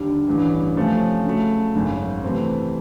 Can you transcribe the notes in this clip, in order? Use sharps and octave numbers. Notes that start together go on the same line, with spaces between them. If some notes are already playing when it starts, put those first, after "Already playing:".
Already playing: D#2 D3 G3
A1 G2 E3
C3 F3 A3 C#4
C#3 F#3 A3
G#1 F#2 C#3
C3 E3 A3 C4